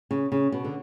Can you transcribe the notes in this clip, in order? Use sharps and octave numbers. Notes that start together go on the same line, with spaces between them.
C#3
C#3
B2
D3